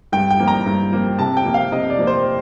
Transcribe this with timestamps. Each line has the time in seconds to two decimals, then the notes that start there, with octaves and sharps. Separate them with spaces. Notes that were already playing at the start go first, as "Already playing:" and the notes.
0.12 G2 G5
0.31 G5
0.40 F3 A#3
0.48 A#5
0.66 G2
0.92 F3 A#3
1.19 C3 A5
1.37 G5
1.45 F3 A#3
1.54 F5
1.72 C3 D#5
1.90 D5
1.99 F3 A#3
2.07 C5